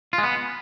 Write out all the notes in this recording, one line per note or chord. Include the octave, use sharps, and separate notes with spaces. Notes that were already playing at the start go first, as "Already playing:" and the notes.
F4
G#3
B3